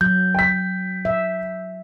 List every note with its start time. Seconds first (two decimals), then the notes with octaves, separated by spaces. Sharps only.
0.01 F#3 G6
0.35 G5 B6
1.05 E5